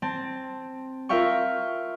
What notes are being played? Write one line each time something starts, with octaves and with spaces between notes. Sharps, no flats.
C4 A5
F4 A#4 E5 F5 G5 C#6